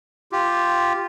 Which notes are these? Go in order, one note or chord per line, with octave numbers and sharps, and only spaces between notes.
F4 G4